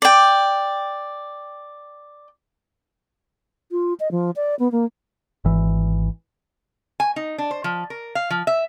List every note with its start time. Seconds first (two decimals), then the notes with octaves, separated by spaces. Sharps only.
0.02 D5 G5
3.72 F4
4.00 D#5
4.11 F3
4.36 D5
4.59 B3
4.72 A#3
5.45 G#1 E3
7.00 G#5
7.16 D#4
7.38 D4
7.51 C5
7.64 F3
7.90 A#4
8.15 F5
8.30 F3
8.47 E5